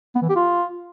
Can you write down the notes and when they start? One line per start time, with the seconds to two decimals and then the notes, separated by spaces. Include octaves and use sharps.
0.15 B3
0.22 E3
0.29 G4
0.36 F4